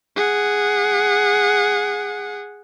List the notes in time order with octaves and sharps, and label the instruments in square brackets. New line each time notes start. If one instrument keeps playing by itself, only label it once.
[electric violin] G#4 F#5